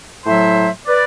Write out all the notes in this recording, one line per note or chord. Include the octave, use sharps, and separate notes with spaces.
A2 F#3 C5 E5
B4 D5